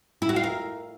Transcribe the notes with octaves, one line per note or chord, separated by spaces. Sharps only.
E4
F#4
F5
A#4